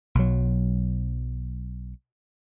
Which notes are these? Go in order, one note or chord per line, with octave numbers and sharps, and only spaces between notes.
B1 F#3